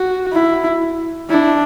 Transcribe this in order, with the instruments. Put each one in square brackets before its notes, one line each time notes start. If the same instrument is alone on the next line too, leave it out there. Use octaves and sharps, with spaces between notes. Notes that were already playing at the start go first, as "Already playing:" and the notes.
Already playing: [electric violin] F#4
[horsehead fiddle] E4
[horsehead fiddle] D4 [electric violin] E4